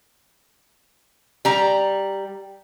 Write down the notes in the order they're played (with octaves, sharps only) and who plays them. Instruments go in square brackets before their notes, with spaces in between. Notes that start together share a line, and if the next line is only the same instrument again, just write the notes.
[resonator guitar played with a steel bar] G3 A#5